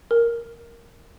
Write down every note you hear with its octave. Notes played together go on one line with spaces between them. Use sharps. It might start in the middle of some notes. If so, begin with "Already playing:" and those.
A#4